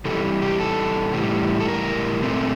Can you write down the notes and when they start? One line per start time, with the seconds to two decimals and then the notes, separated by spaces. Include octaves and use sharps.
0.05 C3 E3 G3 A4
0.42 G4
0.60 A4
1.13 A2 E3 G3
1.60 A4
1.68 A#4
2.22 A#2 A3 C4